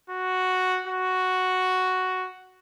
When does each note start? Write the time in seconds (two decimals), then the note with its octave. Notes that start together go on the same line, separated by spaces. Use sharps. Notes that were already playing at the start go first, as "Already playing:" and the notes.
0.10 F#4
0.87 F#4